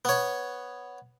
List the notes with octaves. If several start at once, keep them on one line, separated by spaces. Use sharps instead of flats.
B3 C#5